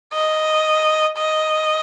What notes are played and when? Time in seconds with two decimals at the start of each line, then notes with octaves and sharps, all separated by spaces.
0.13 D#5
1.18 D#5